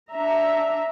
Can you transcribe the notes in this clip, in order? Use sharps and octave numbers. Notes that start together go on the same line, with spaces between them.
D4 E5 A#5